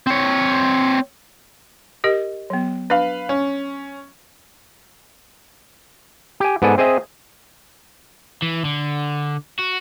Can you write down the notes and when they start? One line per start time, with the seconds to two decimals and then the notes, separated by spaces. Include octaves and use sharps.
0.07 C4 C#5
2.04 G4 A#4 D#5
2.50 F#3 B3
2.90 D4 B4 F5
3.29 C#4
6.40 G4 G#5
6.62 G#2 B3 A4 D5 G#5
6.78 C4 G#4 D#5 E5
8.42 E3
8.65 D3
9.59 F#4